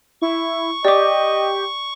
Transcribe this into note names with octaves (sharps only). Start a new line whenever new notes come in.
E4 C#6
G4 D5 D#5 D6